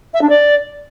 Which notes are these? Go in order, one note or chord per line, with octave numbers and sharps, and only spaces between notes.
E5
D4
D5